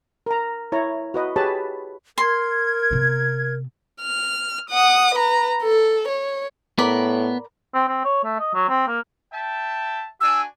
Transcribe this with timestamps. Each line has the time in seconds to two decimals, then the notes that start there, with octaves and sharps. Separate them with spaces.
0.26 A#4 A#5
0.72 E4 C#5 A#5
1.14 F#4 B4 D#5
1.36 G4 G#4 B4 C#5 A5 B5
2.18 A#4 C6 G#6
2.91 C3 B3
4.01 F6
4.70 F#5 D#6
5.15 B4 A#5
5.63 A4
6.08 C#5
6.78 A2 B3 A#4 D5 B5
7.74 C4
7.88 C4
8.05 C#5
8.24 A3
8.39 D#5
8.54 F#3
8.69 C4
8.87 A#3
9.33 E5 G5 A5
10.20 D4 F#4 G#5 E6